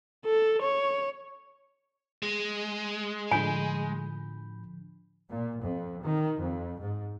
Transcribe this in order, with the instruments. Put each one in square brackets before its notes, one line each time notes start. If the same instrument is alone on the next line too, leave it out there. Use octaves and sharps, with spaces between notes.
[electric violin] A4
C#5
[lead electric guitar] G#3
[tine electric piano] A2 B5 G6 [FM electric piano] D3 F3 [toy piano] G#5
[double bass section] A#2
F2
D#3
F2
G#2